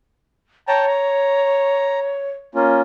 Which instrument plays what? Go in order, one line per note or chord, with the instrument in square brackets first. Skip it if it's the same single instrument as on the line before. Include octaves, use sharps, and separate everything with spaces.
[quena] C#5 [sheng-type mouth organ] G5 A5 A#5
[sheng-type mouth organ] A#5
A#3 C#4 F4